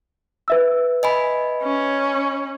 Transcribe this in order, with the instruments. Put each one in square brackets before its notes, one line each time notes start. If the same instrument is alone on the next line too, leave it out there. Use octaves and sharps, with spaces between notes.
[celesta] B4 E5 E6
[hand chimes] D#5 G#5 B5
[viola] C#4